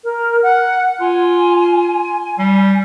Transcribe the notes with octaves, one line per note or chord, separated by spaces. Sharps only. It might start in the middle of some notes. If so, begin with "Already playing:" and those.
A#4
F#5
F4 G#5
G3